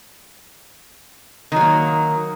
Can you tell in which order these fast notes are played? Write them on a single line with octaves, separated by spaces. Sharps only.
D#3 F#3 A#3